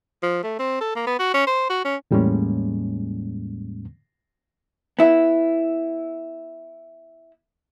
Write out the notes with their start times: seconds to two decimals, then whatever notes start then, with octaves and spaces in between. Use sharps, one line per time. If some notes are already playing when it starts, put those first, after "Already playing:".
0.22 F3
0.43 A3
0.59 C4
0.81 A4
0.96 A#3
1.07 B3
1.19 F#4
1.34 C#4
1.47 C5
1.70 F#4
1.85 C#4
2.11 E2 A2 G3 G#3 A#3 C#4
4.99 B3 E4